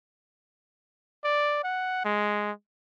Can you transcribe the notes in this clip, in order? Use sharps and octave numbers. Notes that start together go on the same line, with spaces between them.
D5
F#5
G#3